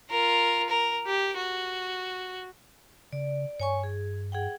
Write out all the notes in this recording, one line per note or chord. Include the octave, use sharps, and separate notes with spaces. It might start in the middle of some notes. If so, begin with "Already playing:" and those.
F4 A#4
A#4
G4
F#4
C#3 D5
G2 C#5 G#5 C#6
G#4
G#4 F#5 G5